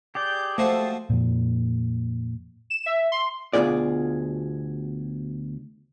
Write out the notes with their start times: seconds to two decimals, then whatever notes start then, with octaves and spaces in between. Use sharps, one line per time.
0.15 G4 G#4 D5 G6
0.58 F3 A3 F#4 A4 C5
1.10 F2 A#2
2.70 E7
2.86 E5
3.12 C6
3.53 D2 B2 F3 F4 G#4 D5